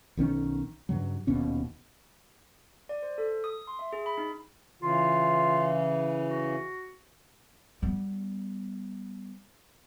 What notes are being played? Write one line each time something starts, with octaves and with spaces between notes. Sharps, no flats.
B1 D#3 C#4
G2 C#3 F#3
D#1 D#2 B2 C#4
D5
C5
A4
D#6
C6
E5
G#4
B5
D#4
C#3 E3 F4
F#4
G3 B3